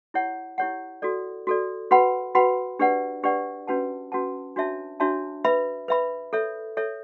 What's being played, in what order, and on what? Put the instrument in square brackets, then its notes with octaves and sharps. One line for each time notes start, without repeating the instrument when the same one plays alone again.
[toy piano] E4 G4 C#5 F#5
E4 G4 C#5 F#5
F#4 A4 D5
F#4 A4 D5
F#4 B4 F#5 B5
F#4 B4 F#5 B5
D4 G4 B4 D5 F#5
D4 G4 B4 D5 F#5
C#4 F#4 B4 F#5 A5
C#4 F#4 B4 F#5 A5
D4 F#4 C#5 E5 A5
D4 F#4 C#5 E5 A5
B4 E5 B5
B4 E5 B5
A4 C#5 E5
A4 C#5 E5